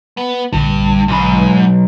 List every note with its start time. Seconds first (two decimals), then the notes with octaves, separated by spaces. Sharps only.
0.17 B3
0.53 A#1 G2 D3
1.08 B1 G#2 B5